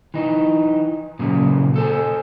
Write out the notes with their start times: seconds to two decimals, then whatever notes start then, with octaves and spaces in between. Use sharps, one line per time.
0.14 E3 D#4
1.19 A#2 C#3 F#3 A#3
1.76 A4 C5 G#5